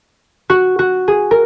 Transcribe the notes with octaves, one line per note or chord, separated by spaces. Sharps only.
F#4
F#4
G#4
A#4